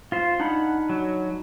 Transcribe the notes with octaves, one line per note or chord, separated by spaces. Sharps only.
F4 C5
D4 D#4 F#5 B5
F#3